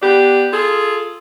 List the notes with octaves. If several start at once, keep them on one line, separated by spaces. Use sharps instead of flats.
B3 D4 G4
F4 G#4 A4